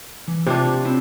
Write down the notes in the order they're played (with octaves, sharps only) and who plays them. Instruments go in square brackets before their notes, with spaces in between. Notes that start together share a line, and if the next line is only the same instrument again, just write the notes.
[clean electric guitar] E3
[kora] C3 D4 [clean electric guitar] F4 C5 C#5
[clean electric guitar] C4 E4